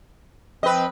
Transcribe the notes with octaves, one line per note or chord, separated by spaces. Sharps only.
F3 C4 B4 D#5